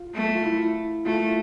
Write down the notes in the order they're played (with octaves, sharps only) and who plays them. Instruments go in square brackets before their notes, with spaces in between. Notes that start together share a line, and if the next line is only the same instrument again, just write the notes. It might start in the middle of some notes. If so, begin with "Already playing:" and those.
Already playing: [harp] F4
[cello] A3
[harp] F4
E4
[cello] A3 [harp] F4